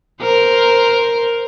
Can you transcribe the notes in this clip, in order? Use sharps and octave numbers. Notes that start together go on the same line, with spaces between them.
A#4 C5